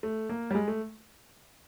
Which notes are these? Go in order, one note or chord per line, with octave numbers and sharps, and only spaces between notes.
A3
A#3
G3
G#3
A3